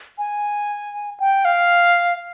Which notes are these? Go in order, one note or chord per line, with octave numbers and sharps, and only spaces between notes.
G#5
G5
F5